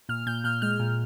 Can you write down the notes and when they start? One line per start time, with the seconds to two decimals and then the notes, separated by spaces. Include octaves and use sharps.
0.09 A#2 F6
0.27 A#2 G6
0.44 A#2 F6
0.62 G#3 F6
0.79 A#2